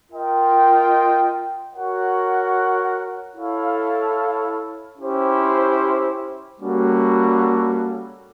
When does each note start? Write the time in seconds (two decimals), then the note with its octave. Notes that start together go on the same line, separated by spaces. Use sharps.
0.11 F4 A#4 D#5 G5
1.74 F#4 A#4 C#5 F#5
3.36 E4 A4 C#5 F5
4.98 C#4 E4 G4 C5
6.60 G3 A#3 C#4 F#4 A4